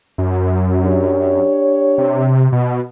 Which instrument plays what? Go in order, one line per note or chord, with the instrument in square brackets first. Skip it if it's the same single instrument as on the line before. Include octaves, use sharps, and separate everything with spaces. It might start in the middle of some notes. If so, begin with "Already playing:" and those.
[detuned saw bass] F#2
[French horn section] D4 G4 C#5
[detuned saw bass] C3
B2